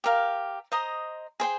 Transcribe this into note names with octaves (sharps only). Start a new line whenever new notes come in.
G4 A#4 F5
C5 D#5 A#5 D#6
G#4 C5 G5